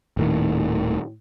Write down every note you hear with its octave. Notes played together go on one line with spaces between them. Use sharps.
D#1 A2 D#3